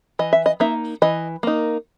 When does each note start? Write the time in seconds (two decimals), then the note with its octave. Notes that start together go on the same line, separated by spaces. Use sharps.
0.19 E3 D#5
0.33 E5
0.46 D#5
0.60 A#3 D#4 E5
1.02 E3 D#5
1.43 A#3 D#4